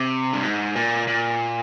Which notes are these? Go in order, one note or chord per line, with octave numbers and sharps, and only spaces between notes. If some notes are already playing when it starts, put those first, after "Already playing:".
Already playing: C3
G2
G#2
A#2
A#2